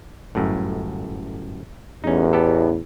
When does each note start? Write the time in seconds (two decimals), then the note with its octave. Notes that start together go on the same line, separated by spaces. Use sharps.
0.35 G1 F#2 A2
2.04 A1 E2 C#4 D#4
2.33 B3 G4 A4